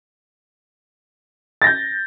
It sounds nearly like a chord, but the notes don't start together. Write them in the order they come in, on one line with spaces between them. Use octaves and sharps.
A6 A#6 G6